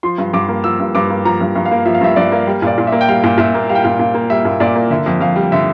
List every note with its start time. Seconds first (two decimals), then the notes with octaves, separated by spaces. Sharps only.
0.03 F3 C6
0.18 G2
0.33 G2 D6
0.48 A#3
0.64 F3 E6
0.80 G2
0.95 G2 D6
1.10 A#3
1.25 F3 A#5
1.41 G2
1.56 G2
1.66 F5
1.71 A#3
1.86 F3 E5
1.94 F5
2.01 G2 E5
2.16 G2 D5
2.32 A#3
2.47 G3
2.62 A#2 D5
2.78 A#2
2.87 E5
2.92 A#3
3.01 G5
3.08 G3 F5
3.24 A#2
3.38 A#2 E5
3.54 A#3
3.69 G3 F5
3.75 G5
3.83 A#2 F5
3.99 A#2
4.14 A#3
4.30 G3 E5
4.45 A#2
4.60 A#2 D5
4.75 A#3
4.90 D3 E5
5.06 F2
5.21 F2 F5
5.36 G3
5.52 D3 E5